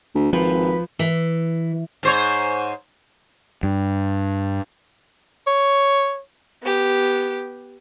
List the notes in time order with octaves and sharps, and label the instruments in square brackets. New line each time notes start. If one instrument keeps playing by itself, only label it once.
[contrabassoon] D2
[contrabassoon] G#1 [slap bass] F3 [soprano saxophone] B4
[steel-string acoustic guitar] E3
[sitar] G#2 C5 C#5
[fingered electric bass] G2
[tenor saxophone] C#5
[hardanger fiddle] B3 G4